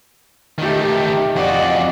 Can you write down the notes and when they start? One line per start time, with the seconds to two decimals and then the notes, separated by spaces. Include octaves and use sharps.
0.58 D#3 A3 D#4 G4
1.36 F2 F#4 D5 D#5